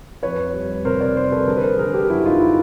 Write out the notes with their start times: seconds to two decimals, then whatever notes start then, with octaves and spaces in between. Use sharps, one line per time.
0.23 F2 B4 C#5
0.54 G3
0.85 C3 A#4 C5
1.00 C5 D5
1.16 G3 A#4 C5
1.31 A4 B4
1.47 D3 G#4 A#4
1.57 B4
1.63 A#4 C5
1.78 D3 G#4 A#4
1.94 G4 A4
2.10 F#2 E4 F#4
2.25 D#4 F4
2.40 E4